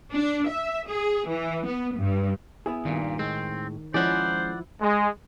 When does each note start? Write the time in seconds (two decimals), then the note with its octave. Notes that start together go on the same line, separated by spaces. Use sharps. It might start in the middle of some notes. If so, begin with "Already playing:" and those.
0.14 D4
0.49 E5
0.89 G#4
1.28 E3
1.66 B3
1.98 G2
2.66 B3 E4 G#4
2.85 G2 A#2 D#3
3.19 A2 G#3 C4
3.94 F3 G#3 C#4 E4 G#4 C5 D5 F#5
4.81 G#3